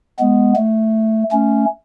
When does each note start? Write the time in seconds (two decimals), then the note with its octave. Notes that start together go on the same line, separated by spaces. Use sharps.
0.19 G#3 B3
0.57 A3
1.32 A3 C#4